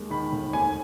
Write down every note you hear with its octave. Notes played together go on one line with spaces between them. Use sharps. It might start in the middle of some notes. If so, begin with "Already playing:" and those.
Already playing: D#2 G#3
D#3 B5
F1
D#2 G#5